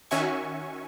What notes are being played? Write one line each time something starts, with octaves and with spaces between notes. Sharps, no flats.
D#3 C#4 F#4 E5 G#5 C#6